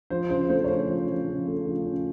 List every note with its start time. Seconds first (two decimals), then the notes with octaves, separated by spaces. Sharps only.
0.10 F3 C5
0.30 C#3 C5
0.50 A3 C5
0.64 C#5
0.68 C#4 C5
0.88 F3
1.08 F3
1.27 C#3
1.47 A3
1.66 F3
1.85 C#4